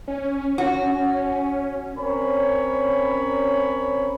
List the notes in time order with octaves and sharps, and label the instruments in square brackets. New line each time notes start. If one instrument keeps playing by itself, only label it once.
[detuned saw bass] C#4
[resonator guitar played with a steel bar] F#4
[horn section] C4 C#4 A#4 C#5 B5